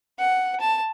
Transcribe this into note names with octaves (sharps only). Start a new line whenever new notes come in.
F#5
A5